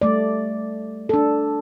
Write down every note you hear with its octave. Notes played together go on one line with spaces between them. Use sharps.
G3 A3 D5
D4 A4